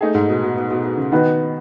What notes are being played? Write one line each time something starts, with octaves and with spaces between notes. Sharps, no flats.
A3 D#4 G#4
G#2
B2
B2
B2
B2
B2
C#3
D#3 B3 D#4 F#4 B4